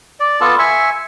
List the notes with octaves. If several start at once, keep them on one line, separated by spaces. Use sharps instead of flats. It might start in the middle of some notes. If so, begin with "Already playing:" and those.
D5
B3 F4 A4 A5
E5 G#5 C#6